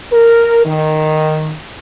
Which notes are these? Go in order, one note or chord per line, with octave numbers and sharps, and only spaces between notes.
A#4
D#3